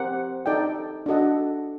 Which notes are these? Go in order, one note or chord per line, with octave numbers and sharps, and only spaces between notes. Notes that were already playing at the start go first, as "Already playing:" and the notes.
Already playing: C4 G4 A#4 F#5
D#4 A4 D5 G5
D4 F#4 A4 D#5 F#5